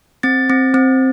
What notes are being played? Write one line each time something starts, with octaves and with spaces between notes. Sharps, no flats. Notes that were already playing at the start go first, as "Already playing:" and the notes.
C4 A6
C4
C4